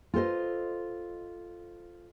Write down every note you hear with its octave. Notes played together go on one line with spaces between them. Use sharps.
F4 A4 C5 D#5